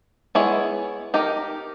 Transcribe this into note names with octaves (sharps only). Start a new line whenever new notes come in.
G#3 B3 E4 G#4 C#5
D#4 G4 A#4